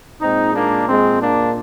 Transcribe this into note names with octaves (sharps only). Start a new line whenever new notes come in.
A#2 G#3 C4 D#4
A#3 D4
G#3 C4
A#3 D4